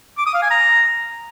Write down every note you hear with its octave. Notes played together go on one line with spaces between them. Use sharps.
D6
D#6
F5
G#5
A#5